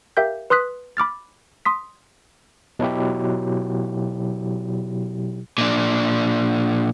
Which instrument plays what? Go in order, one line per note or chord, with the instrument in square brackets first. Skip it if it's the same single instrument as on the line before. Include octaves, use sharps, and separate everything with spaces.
[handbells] G4 A#4 E5 F5 G5 G6
B4 C6 D#6 F#6 B6
B5 D6 F6 A6
C6 D#6 B6
[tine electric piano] B2 F#3 E4 G4
[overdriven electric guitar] A#2 D4